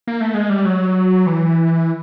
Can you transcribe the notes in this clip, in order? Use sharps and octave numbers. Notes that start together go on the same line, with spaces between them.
A#3
A3
G#3
G3
F#3
E3